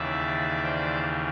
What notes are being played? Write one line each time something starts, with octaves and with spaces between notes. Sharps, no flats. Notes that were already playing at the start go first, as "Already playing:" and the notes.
Already playing: D#2 C#3 E3 D5 E5
C5 D5